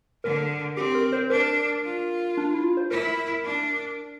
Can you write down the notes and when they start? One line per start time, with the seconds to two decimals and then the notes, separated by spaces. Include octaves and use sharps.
0.24 D3 A#4
0.76 C4 G4
0.95 A#4
1.12 C5
1.30 D4 A#4
1.84 F4
2.37 D4
2.54 E4
2.64 F4
2.77 C5
2.91 E4 A#4
3.44 D4